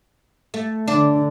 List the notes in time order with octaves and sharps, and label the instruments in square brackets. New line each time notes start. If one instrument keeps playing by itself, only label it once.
[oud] A3
[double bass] D3 [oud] D4